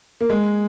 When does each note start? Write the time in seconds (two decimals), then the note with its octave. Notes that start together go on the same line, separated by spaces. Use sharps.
0.21 A#3
0.30 G#3